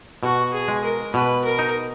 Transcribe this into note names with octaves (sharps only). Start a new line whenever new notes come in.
B2 F#4
G#4
G#3
A#4
B2 B4
A#4
D#4